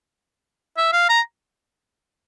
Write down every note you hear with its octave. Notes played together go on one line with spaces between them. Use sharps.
E5
F5
A#5